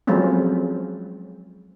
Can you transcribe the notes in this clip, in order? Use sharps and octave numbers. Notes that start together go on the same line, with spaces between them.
F3 F#3 G#3 A3 C4 C#4